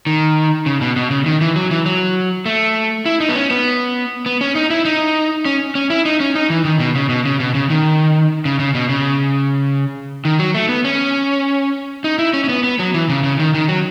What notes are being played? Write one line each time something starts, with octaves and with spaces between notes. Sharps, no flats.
D#3
C#3
B2
B2
C#3
D#3
E3
F#3
E3
F#3
A3
E4
D#4
B3
C#4
B3
B3
C#4
D#4
E4
D#4
C#4
C#4
E4
D#4
C#4
D#4
E3
D#3
B2
C#3
B2
C#3
B2
C#3
D#3
C#3
C#3
B2
C#3
D#3
F#3
A3
B3
C#4
D#4
E4
C#4
C#4
B3
B3
F#3
E3
C#3
C#3
D#3
D#3
F#3